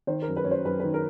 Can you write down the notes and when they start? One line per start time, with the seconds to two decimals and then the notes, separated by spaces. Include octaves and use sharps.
0.07 D#3 C5
0.22 A#4
0.28 F#2
0.37 B4
0.44 F#2 C#5
0.51 C5
0.65 F#2 B4
0.80 D#3 B4
0.94 A#4